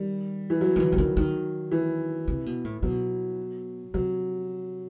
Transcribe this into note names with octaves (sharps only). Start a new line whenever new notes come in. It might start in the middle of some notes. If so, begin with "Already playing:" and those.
Already playing: D#3 G3
E3
F#3
D#3
E3
C3
D#3
D#3
E3
C3
B2
A2
B2 F#3
C3 F#3